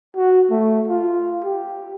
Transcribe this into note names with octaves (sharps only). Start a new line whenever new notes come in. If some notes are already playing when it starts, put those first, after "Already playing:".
F#4
A3
F4
G4